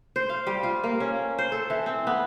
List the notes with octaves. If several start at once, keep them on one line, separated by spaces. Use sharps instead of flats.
C5
F5
G3
F4
A#3
C#4
C5
A4
E3
C4
B3